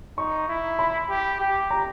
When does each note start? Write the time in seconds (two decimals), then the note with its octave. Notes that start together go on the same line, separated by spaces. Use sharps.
0.18 D#4 C#6
0.48 E4
0.79 B5
1.09 G4
1.40 G4
1.71 A#5